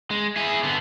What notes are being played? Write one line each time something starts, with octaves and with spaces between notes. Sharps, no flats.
G#3
E4 G#4
D3 B3